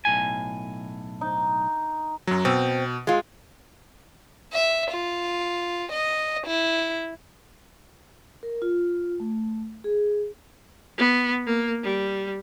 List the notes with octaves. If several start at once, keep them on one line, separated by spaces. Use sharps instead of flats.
B1 A2 G#5
D#4
F#2 F#3
B2 C4
G#3 F4
E5
F4
D#5
E4
A#4
F4
A3
G#4
B3
A#3
G3